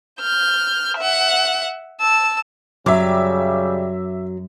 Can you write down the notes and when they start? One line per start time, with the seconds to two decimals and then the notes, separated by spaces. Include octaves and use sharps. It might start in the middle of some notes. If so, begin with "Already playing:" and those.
0.20 F6 G6
0.97 E5 F#5
2.00 A5 E6
2.86 F#2 C#3 F#3 G3 E5 D6